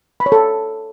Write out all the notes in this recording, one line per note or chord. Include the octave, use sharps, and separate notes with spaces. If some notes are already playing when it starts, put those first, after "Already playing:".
B5
C#5
A4